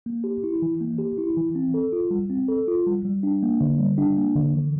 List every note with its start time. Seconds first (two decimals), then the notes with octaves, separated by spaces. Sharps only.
0.06 A#3
0.24 G4
0.44 E4
0.62 E3
0.81 A#3
0.98 G4
1.18 E4
1.37 E3
1.55 C4
1.74 A4
1.93 F4
2.11 G3
2.30 C4
2.48 A4
2.68 F4
2.87 G3
3.05 G3
3.23 D4
3.43 A#3
3.61 D3
3.79 G3
3.98 D4
4.17 A#3
4.35 D3
4.55 E3